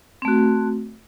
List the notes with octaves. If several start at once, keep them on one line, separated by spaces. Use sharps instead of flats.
A3 C4 F#4